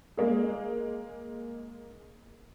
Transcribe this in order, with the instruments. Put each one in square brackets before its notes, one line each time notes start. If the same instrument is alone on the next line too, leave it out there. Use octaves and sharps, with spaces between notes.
[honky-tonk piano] G#3 A#3 G#4